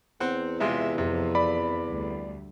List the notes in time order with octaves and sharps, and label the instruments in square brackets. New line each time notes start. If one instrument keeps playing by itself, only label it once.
[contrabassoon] E2 [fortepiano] C4 F#5
[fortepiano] C3 G#3 F4 [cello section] E5
[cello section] F2 [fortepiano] C3
[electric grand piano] D5 B5
[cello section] D2 G3